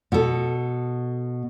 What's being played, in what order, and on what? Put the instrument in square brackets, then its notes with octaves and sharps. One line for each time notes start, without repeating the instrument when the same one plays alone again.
[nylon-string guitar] B2 A4